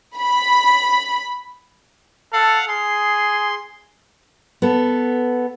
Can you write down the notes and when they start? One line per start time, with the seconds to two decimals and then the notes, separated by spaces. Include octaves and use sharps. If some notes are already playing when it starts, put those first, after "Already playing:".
0.18 B5
2.33 A4 F5 F#5
2.68 G#4 C6
4.62 B3 A4